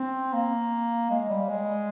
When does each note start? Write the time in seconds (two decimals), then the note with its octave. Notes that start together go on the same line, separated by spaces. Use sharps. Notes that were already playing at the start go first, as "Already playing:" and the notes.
Already playing: C4
0.33 A#3
1.10 G#3
1.29 G3
1.49 G#3